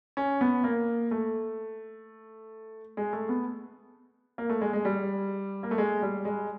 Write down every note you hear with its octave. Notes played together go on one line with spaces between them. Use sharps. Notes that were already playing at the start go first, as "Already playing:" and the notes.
C#4
B3
A#3
A3
G#3
A3
B3
A#3
A3
G#3
G#3
G3
A#3
A3
G#3
G3
G#3